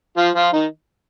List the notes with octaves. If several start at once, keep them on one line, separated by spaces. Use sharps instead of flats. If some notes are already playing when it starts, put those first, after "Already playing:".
F3 F4
F3 F4
D#3 D#4